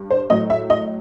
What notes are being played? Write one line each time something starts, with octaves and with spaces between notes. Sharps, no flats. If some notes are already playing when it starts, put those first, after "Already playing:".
Already playing: G2
C5
A2 F#3 A3 D#5
E5
D#5